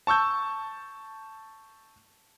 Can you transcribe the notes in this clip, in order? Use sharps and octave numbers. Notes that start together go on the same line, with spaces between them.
A5 C#6 E6 G6